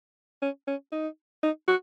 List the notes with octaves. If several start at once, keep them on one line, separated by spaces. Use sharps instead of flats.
C#4
C#4
D#4
D#4
F#4